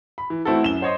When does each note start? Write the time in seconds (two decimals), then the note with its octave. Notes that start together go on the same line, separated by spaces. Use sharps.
0.18 B5
0.30 E3
0.45 E3 A3 C4 E4 F#4 A4
0.63 F#2 E7 G7
0.82 C5 C#5 D#5 C6